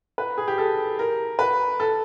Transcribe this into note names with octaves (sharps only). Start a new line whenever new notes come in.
B4
G#4
G4
A4
A#4
B4
A4